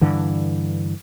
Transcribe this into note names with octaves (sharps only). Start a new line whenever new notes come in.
G2 D3 E3